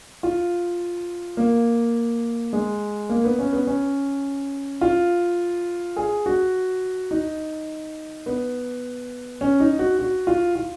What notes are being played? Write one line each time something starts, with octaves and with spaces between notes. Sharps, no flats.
F4
A#3
G#3
A#3
B3
C#4
B3
C#4
F4
G#4
F#4
D#4
B3
C#4
D#4
F#4
F#4
F4
F4